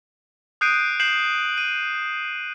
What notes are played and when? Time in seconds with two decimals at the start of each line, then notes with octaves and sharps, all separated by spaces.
0.61 D#6 F#6 G6 C7 D7 D#7
1.00 G6 C7 E7 F#7
1.58 D#7